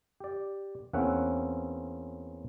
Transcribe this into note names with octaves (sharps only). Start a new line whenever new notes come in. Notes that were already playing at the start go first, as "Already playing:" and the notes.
G4 D5
E2 A#3 C4 C#4 E5 F#5